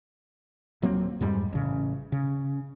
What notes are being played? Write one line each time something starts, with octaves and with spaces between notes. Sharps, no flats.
D#1 F#3 A#3 C4
F2 G#2 G3 G#3
A1 C#3
C#3